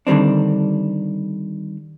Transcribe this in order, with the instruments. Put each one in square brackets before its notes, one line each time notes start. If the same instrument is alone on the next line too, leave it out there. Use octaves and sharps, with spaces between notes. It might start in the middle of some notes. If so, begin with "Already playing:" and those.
[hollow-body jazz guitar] D3 D#3 G3 C4 D4